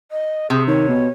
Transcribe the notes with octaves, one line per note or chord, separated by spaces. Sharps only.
D#5
C3 G#4
D#3 C#5
B2